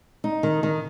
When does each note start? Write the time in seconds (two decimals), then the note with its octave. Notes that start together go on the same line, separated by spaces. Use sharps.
0.24 D#4
0.43 D#3
0.63 D#3